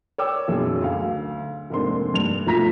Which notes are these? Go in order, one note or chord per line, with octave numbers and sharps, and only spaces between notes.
C#5 D5 G5 D6 E6
B1 F#2 F#3 G#4
D2 F5
F1 G#2 A#3 C4 D4 C6
G2 D4 F7
B1 F3 A3 A#5 A#6 B6